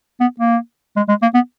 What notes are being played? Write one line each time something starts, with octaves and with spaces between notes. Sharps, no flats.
B3
A#3
G#3
G#3
A#3
B3